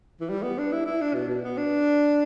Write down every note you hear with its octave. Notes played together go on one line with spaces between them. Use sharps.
E3
G3
B3
D4
E4
E4
D4
B2
B2
B3
D4